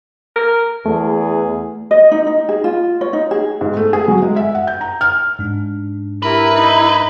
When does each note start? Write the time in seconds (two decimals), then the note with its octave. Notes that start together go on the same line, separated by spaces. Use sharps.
0.36 A#4
0.86 E2 A3 G#4
1.91 D#5
2.11 D#4
2.27 D#4
2.49 G#4
2.64 F4
3.01 C#5
3.13 D#4
3.31 G#4
3.61 G#2
3.77 A3
3.93 G#4
4.08 F#3
4.22 G#3
4.36 E5
4.55 F#5
4.67 G6
4.81 A#5
5.01 F6
5.39 G#2 D4
6.22 E4 G4 A#4 B4
6.52 D#4 B5